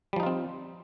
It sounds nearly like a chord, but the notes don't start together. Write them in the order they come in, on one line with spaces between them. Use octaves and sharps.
G3 F3 D#4 F4 C4